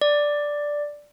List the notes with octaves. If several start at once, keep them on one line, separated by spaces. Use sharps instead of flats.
D5